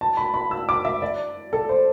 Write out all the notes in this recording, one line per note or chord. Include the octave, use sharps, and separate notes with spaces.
A5
B5
B5
E6
D6
E5
D5
A4
C5